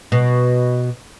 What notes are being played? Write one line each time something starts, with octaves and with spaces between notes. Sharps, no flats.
B2